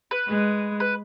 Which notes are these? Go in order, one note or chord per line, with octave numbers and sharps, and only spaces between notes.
B4
G#3
B4